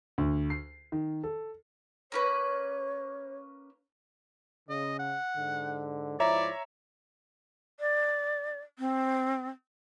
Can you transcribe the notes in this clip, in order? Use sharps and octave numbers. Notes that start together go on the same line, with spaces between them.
D2
C7
D#3
A4
A#3 C#4 B4 C#5
C#3 D#5
F#5
G#2 D3
G#2 F3 E4 C#5 D5 E5 A#5
D5
C4